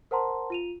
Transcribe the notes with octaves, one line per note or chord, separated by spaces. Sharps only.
A#4 C5 F#5 A5 A#5 C6
F4 D#7 F7